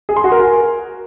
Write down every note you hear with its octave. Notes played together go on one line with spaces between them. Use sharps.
G#4
C6
F#4
A#4
G#5